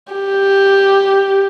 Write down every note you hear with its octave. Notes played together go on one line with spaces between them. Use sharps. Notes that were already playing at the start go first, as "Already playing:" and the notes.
G4